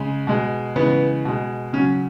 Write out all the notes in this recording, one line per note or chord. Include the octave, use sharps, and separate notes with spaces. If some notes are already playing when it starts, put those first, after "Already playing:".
Already playing: C#3 G#3
B2 G#3
C#3 E3 G#3 B3
B2 G#3
C#3 F#3 C#4